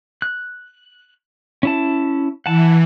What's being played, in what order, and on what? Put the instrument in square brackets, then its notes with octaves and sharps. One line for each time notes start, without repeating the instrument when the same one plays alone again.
[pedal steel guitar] F#6
C#4 E4 A5
[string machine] E3 [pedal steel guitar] F#5 A5